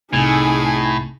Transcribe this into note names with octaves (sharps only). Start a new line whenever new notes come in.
C2 A2 C3 D#4 G#4 G#5